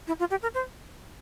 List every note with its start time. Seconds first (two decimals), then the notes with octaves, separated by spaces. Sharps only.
0.07 E4
0.19 F4
0.31 G4
0.42 A#4
0.54 C5